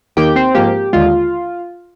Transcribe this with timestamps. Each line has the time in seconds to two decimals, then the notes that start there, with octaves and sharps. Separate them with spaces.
0.16 D#2 D#3 A#3 G4 G5
0.36 C4 C5
0.55 G#2 F3 A#3 G4
0.93 D#2 D3 G#3 F4